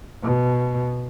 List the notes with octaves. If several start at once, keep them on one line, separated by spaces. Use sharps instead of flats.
B2